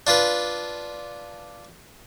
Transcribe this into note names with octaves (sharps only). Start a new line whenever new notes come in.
D4 F4 B4